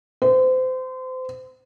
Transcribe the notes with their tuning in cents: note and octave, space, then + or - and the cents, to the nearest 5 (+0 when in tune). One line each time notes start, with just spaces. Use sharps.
C5 -30